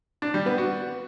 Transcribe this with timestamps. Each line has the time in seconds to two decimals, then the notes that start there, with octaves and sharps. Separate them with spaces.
0.22 D4
0.34 G3
0.46 B3
0.58 F#4